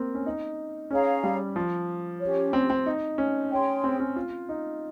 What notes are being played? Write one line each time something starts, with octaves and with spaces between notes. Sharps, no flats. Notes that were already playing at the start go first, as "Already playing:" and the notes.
Already playing: A#3 C4
C#4
D#4
C#4 G#4 C#5 F5 A#5
G3
F3
C#4 G4 C#5
C4
C4
D#4
C#4
G#4 C#5 G5 C6
C4
C#4
F4
D#4